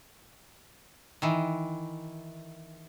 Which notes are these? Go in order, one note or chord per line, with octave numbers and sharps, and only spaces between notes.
D#3 E3